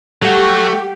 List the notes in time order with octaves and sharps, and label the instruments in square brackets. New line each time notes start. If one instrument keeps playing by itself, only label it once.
[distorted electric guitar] F#3 F#4 [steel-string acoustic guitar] G3 F#5 [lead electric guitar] A3 [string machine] G4